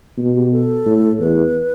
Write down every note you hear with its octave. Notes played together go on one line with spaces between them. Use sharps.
B2
G4
A4
A2
E2 B4